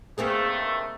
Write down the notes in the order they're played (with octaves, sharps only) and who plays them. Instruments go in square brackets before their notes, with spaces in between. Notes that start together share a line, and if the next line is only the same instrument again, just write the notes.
[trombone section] G2 D#3 A3 [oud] A#3 C4 G#4